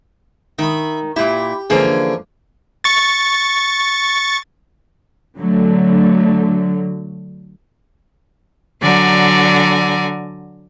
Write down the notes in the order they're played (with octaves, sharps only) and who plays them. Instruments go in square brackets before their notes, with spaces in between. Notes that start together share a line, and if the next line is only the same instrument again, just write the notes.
[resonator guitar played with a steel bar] D#3 [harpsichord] E5 B5
[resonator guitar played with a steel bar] A#2 E4 [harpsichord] G4
[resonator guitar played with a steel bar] D3 A#3 G#4 [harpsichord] E3 F3 C#4
[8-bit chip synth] C#6 A6
[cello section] D3 F#3 A3
[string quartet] D3 F#3 D5 G#5 A#5